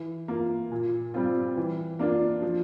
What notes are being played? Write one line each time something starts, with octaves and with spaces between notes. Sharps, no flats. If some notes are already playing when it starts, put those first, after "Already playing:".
Already playing: E3
A#3 F4
A#2
G3 C4 F4
E3
A#3 D4 F4
F3